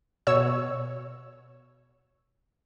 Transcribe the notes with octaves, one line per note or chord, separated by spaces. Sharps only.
B2 C#5 E6